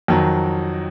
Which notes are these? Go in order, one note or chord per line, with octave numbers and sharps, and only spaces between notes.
F2 D#3 F#3